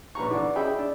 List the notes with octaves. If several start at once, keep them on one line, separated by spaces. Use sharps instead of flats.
A#1 B4 A#5 C#6
D3 E3 D4 F#4 D5
C#4 G#4 D#5 E5 G5 B5
D4